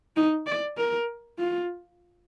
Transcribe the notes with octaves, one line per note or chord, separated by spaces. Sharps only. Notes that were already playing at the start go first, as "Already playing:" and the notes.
D#4
D5
A#4
F4